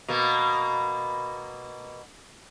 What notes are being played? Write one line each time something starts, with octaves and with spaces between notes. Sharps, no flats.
B2 A#3